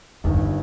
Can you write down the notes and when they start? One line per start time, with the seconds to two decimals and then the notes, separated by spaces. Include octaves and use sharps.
0.24 G1 E2 G2 D#3
0.34 F2